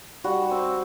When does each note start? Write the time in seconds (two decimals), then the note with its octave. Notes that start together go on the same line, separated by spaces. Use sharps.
0.24 G3 F#4
0.51 C4